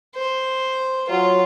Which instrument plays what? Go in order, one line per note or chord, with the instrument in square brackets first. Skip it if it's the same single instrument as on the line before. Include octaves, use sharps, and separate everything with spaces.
[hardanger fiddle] C5
[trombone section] F#3 [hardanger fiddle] F4